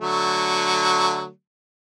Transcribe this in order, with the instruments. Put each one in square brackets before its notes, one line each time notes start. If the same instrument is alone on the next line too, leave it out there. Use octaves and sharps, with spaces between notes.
[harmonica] D3 F#3 A3